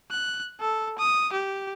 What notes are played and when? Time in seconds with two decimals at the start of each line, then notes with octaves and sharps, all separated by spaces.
0.11 F#6
0.61 A4
0.98 D#6
1.33 G4